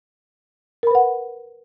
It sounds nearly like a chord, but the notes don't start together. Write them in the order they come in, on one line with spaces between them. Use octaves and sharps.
A#4 B5 B4 F#5